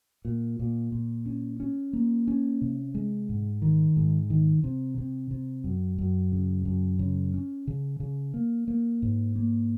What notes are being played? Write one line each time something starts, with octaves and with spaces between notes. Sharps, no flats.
A#2
A#2
A#2
C#4
C#4
A#3
C#4
C3
G#3
G#2
D#3
G#2
D#3
C3
C3
C3
F#2
F#2
C#3
F#2
C#3
C#4
C#3
C#3
A#3
A#3
G#2
A#3